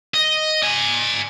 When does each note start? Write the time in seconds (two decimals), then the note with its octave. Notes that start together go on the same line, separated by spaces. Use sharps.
0.14 D#5
0.63 D5 G#5